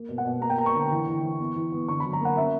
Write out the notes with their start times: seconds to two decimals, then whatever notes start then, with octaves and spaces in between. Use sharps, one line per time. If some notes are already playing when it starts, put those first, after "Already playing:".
Already playing: A#3
0.09 B2
0.18 F#5
0.25 B2
0.41 A#3 A#5
0.50 G5
0.58 A#3 A#5
0.66 C#6
0.75 D3
0.91 E3
1.07 E3
1.23 E3
1.39 B3
1.56 E3
1.72 B3
1.88 D3 C#6
2.00 F#3 B5
2.13 A#5
2.21 A#3 F#5
2.37 C#4 E5